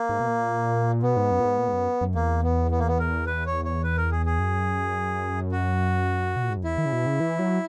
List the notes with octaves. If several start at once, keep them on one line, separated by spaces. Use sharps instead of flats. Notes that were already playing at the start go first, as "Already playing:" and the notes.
Already playing: A#3
G#2
B2
A#2
B2 B3
G#2
F#2
A#2
G#2
A#2
G#2
F#2
F#2
E2 A#3
B3
B3
A#3
B3
A#4
B4
C#5
C#5
B4
A#4
G#4
G#4
F#2
F#4
B2
A#2
G#2
F#2
E2 E4
D#3
C#3
B2
C#3
E3
F#3